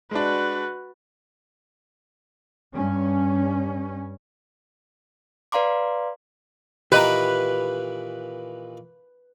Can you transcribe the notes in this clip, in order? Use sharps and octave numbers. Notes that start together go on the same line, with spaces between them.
G#3 D4 F#4 B4
G2 C#4
B4 D5 F5 A#5 C6 D6
A#2 D#3 E3 G4 B4 D#5 A#5